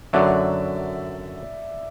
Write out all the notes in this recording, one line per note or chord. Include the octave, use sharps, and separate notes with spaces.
F#2 D3 F#3 D5 E5